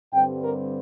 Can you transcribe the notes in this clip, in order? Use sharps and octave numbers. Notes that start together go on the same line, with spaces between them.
G2 D3 G3 C4 G5
A#4